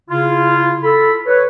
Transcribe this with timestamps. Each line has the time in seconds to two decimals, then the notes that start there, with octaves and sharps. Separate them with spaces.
0.10 C#3 E4 F4
0.83 A4 B5
1.27 B4 C#5